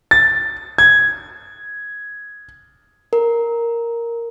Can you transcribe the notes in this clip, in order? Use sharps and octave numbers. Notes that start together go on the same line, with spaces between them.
A6
G#6
A#4